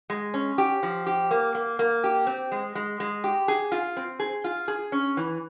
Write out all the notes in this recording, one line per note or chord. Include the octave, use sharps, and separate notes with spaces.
G#3
C#4
G4
F3
G4
A#3
A#3
A#3
G4
C4
G#3
G#3
G#3
G4
G#4
F4
C4
G#4
F4
G#4
C#4
E3